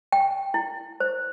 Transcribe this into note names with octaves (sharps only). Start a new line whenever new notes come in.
G5
E4
C5